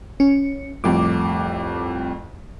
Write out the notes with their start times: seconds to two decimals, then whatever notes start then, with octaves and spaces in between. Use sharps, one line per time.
0.20 C#4
0.84 C2 F2 A2 D6